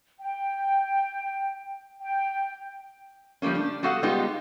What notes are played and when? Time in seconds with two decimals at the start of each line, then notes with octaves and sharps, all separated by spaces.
0.20 G5
2.02 G5
3.42 F3 G3 A3 A#3 C#4
3.55 D4
3.83 G3 B3 F#4 A4 F5 F#5
4.03 G3 G#3 B3 D#4 F4 G4